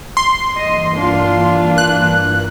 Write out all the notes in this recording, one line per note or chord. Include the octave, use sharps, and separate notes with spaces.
C6
G2 E3 A#3 D#5
D4 F4
F#6